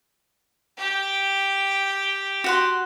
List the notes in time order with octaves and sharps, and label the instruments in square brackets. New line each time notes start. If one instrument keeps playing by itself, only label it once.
[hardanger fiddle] G4 G5
[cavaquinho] F#4 F#5 C6